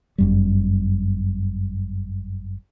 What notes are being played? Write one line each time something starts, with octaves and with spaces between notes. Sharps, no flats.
G1 F#2 G3